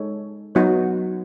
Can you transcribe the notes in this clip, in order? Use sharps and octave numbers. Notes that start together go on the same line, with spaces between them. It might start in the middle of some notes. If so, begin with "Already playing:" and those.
Already playing: G#3 D#4 A4 C#5
F#3 B3 D#4 F#4 C#5